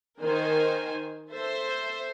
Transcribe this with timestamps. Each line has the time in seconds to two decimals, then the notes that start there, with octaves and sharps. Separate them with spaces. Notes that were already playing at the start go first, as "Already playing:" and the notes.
0.21 D#3 A#4 C5 G#5
1.31 A4 C5 E5